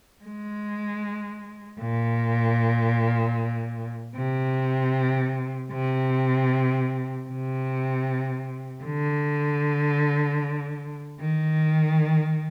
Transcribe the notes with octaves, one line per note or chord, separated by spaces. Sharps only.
G#3
A#2
C3
C3
C3
D3
D#3